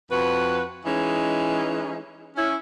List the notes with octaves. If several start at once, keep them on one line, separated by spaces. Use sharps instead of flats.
F2 F#4 B4
E3 G#3 C#4 D#4
C#4 E4